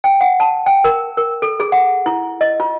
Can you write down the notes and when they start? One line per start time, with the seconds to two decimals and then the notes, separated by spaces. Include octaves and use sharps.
0.04 G5
0.21 F#5
0.40 A5
0.66 G5
0.84 A#4
1.17 A#4
1.42 A4
1.60 G#4
1.72 F#5
2.06 E4
2.41 D#5
2.60 F4